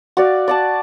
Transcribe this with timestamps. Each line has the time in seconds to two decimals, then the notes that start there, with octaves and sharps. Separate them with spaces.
0.17 F#4 D5 F5
0.48 D5 F#5 A5